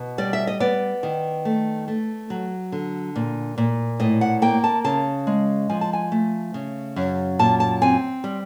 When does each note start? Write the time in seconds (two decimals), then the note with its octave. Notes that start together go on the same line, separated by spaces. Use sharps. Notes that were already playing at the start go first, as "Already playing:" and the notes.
Already playing: B2
0.18 G3 D5
0.33 E5
0.47 D#5
0.60 B3 D5
1.03 D#3
1.45 A3
1.88 A3
2.30 F#3
2.72 D3
3.16 A#2
3.58 A#2
4.00 A2 D#5
4.21 F#5
4.42 A#3 G5
4.64 A5
4.84 C#3 A5
5.27 G#3
5.69 F3 G#5
5.81 A5
5.93 G#5
6.12 A3
6.54 C#3
6.96 F#2
7.39 A#2 A5
7.60 A5
7.82 C4 G#5
8.24 G3